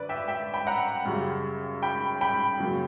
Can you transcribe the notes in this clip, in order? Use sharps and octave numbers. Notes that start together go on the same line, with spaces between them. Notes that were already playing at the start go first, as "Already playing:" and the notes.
Already playing: F#2 D3 B4 D5
E5 G5
E5 G5
G5 B5
F#5 A#5
F#2 C#3 G3
G5 B5
G5 B5
F#2 C#3 F#3 A#3